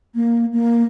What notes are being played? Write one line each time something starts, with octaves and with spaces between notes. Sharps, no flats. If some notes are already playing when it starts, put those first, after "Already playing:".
A#3
A#3